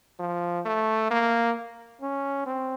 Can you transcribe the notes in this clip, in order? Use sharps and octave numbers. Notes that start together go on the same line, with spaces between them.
F3
A3
A#3
C#4
C4